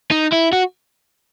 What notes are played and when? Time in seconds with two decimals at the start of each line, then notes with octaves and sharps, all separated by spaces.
0.11 D#4
0.32 E4
0.52 F#4